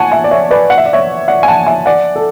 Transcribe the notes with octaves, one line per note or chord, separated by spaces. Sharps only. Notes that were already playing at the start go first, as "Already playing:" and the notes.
Already playing: C#5 F#5 G#5 A5
E5 G#5
D5
C#5 E5
B4 D5
F#5
E5
D5
C#5 E5
D5 F#5
G#5
F#5 A5
E5 G#5
D5 F#5
A4